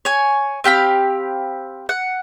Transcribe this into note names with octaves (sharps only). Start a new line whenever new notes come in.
C#5 G#5
C4 G4 F5 B5
F#5